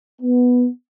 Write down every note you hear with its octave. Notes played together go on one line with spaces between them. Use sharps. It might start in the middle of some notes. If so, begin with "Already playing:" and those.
B3